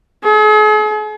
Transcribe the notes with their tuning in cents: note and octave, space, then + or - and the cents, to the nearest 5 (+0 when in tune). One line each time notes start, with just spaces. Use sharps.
G#4 +45